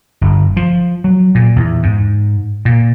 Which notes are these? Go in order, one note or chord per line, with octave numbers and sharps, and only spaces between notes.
G1
F3
F#3
A#2
E2
G#2
A#2